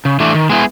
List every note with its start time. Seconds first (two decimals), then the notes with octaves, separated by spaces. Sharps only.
0.05 C#3
0.20 E3 A3 D4
0.35 D#3
0.50 G#3 B3 E4 G#4